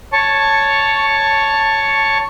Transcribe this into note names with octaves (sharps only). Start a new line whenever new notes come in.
C#5 A5 C#6